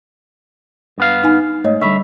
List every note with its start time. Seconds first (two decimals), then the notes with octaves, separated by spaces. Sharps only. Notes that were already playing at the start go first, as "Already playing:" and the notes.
0.98 G2 B3 F5
1.24 D#4 G#5
1.64 G#2 A3 C#5 D#5
1.81 D3 G3 E5 B5 C#6